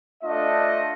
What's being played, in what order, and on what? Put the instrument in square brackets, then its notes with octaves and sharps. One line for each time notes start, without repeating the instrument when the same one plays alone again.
[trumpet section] A3 D4 F4 D#5